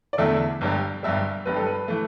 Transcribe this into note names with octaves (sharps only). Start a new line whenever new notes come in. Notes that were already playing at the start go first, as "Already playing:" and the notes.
D5
E2 D3 A3 E5
G1 G2 G3
G1 G2 G3 E5
G1 G2 G3 B4
A4
B4
E3 A3